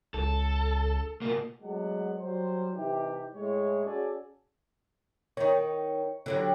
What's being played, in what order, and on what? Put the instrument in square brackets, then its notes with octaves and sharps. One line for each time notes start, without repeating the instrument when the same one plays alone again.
[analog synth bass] C#2 [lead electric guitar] A4
[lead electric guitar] B2 A#3
[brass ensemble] F#3 G#3 A3 B3 D4 F#5
F#3 G3 C5
C3 E3 D#4 G4
A2 G#3 C#5
C#4 F#4 G#4 A4 D5 G#5
[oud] D#3 D#4 [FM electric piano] C#5
[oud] D3 F#3 G3